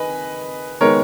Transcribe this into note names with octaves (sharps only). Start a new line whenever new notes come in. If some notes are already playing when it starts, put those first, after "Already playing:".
Already playing: D#3 B4 D#5 G#5
D#3 G#3 B3 A#4 C#5